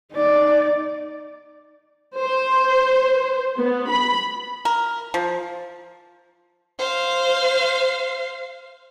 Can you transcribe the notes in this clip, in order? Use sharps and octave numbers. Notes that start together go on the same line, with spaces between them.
D#4 D5
C5
B3
B5
A#4
F3
C5 F5